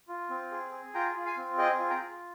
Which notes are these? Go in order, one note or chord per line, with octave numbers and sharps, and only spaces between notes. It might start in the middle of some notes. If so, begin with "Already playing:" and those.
F4
C4
G#4
G#4
F4 G5 A#5
F4
F5 G#5
C4
G#4 D#5 G5
F4
G5 A#5
F4